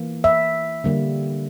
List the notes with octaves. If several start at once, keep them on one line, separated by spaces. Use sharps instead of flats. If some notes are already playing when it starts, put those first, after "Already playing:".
Already playing: E3 A#3
E5
D3 G3 A#3